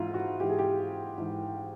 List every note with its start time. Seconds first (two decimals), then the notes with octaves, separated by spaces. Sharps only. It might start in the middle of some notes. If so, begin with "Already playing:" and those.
Already playing: G#2 E3 E4 F4
0.14 F#4
0.40 G#2 E3 G4
0.50 G#4
0.59 G4
1.18 G#2 E3